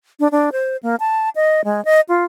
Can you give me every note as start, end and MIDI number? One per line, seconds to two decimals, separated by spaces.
0.20 0.28 62
0.32 0.50 62
0.52 0.77 72
0.83 0.95 58
1.00 1.29 81
1.35 1.61 75
1.65 1.83 56
1.85 2.00 75
2.09 2.24 65